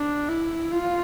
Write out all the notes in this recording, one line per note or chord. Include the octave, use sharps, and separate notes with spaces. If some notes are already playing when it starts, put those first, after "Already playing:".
Already playing: D4
E4
F4